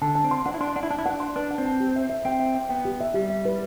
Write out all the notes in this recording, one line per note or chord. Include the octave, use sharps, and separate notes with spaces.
D3 A5
A5
C4
C6
D4 F#5
E4
D4 C6
D4 F#5
E4
D4 A5
E4
D4 F#5
C6
D4 B4
F#5
C4
A5
G4
E5
E5
C4 G5
E5
G5
B3 G5
G4
E5
G3 G4
E5
B4